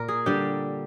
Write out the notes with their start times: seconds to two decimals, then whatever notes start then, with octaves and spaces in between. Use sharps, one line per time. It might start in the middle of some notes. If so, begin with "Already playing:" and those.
Already playing: A#2 A#4
0.08 G#4
0.26 D3 G3 G4